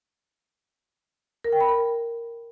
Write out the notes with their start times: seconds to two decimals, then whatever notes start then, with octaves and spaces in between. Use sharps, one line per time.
1.44 A#4
1.52 G5
1.60 B5
1.69 A#4